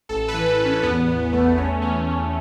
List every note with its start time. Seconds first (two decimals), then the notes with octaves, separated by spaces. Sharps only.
0.09 A1 A4
0.28 B4
0.34 E3
0.46 A4
0.59 A1
0.65 C#4
0.83 E2 B3
1.08 E2
1.33 A3
1.57 E2 C#4
1.82 E2 C#4
2.07 E2 C#4